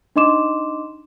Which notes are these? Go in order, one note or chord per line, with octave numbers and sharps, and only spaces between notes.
D4 D#4 D#5 C6 D6 E7